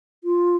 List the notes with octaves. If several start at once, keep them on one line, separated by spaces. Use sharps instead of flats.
F4